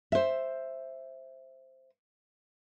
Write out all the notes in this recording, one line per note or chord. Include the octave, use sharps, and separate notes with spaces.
C5 E5